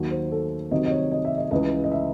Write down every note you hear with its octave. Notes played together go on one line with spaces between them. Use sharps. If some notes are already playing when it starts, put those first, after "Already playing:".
Already playing: D#2 D#3 F#3
C5
A4
C2 C3 D#3 F#3 D#5
D#5
C#5
D#5
E5
D#5
C#2 C#3 E3 D#5
D#5
E5